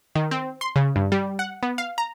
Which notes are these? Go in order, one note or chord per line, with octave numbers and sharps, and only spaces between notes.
D#3
C4
C6
C#3
G2
G3
F#5
B3
F5
A#5